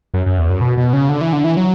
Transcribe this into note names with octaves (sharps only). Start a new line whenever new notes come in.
F#2
F#2
E2
F#2
B2
B2
C#3
D3
E3
D3
E3
F#3